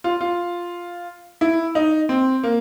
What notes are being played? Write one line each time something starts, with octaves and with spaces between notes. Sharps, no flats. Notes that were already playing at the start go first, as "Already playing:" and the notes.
F4
F4
E4
D#4
C4
A#3